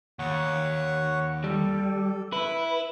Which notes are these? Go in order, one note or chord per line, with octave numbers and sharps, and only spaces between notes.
D#2 C#5 F#5 C#6
G3 A4
E4 B4 E5